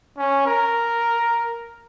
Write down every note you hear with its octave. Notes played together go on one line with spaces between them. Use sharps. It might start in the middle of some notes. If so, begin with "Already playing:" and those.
C#4
A#4